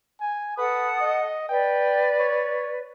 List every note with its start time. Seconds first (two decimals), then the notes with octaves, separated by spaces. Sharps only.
0.20 G#5
0.57 A4 B4 F#5 D#6
1.01 D#5
1.49 B4 D5 G5
2.19 C#5